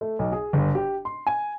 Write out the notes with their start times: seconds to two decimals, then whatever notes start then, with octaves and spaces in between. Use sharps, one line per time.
0.01 A3
0.19 B1
0.32 G#4
0.53 G1
0.75 G4
1.05 C6
1.27 G#5